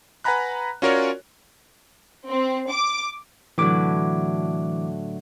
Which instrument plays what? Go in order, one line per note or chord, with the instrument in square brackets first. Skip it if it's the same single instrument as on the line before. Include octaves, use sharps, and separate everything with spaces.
[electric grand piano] B4 F#5 G#5 A#5 B5 F#6
C#4 F4 F#4 A#4 C#5 D5
[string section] C4
D6
[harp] A2 D3 F#3 [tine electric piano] E3 D6